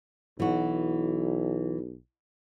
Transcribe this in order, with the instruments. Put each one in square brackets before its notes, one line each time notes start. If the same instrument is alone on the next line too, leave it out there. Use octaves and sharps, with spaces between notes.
[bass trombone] B1 [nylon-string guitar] E3 F#4